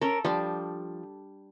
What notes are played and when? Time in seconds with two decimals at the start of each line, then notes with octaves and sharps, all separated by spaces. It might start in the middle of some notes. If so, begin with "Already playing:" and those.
0.01 C#4 A4 A#4
0.25 F3 G3 D4